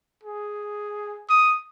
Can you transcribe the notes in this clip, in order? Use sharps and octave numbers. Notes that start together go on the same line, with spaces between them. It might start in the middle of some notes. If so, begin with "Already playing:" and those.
G#4
D#6